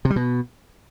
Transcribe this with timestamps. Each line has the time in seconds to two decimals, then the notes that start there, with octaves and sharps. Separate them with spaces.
0.05 C3
0.10 G3
0.16 B2